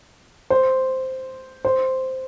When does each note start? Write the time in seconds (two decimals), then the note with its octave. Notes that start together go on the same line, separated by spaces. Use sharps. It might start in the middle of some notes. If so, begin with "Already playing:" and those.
0.50 C5
1.65 C5